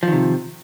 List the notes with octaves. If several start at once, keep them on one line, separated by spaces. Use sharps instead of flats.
C3 D#3 F3